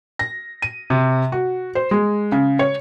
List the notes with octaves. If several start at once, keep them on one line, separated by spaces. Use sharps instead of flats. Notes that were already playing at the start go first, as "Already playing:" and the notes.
A#6
D#7
C3
F#4
C5
G#3
C#3
C#5